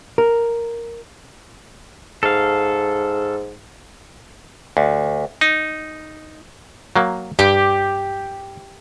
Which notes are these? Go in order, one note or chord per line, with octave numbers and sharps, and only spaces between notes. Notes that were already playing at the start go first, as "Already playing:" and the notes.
A#4
G#2 A4 F5
D2
D#4
F#3 A#3
G2 G4